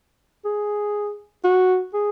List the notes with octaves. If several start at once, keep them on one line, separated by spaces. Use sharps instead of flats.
G#4
F#4
G#4